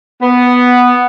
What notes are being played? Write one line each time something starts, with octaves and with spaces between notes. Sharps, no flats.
B3